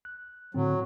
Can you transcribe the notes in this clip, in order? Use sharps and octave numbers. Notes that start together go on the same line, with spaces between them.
F#6
A2 D3 F#3 C4